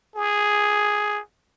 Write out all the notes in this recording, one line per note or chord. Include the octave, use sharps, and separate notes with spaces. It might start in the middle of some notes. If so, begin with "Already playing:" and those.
G#4